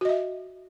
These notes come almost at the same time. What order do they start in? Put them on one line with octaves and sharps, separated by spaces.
F#4 D#5 E5